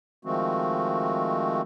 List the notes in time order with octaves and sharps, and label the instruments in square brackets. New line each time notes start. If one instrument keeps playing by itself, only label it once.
[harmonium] D#3 F3 G#3 A3 C4 F#4